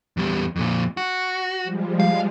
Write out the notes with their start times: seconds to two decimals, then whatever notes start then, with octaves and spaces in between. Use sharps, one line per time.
0.17 E2 G3
0.56 F2 A#2
0.97 F#4
1.63 F3 G3 G#3
2.00 F5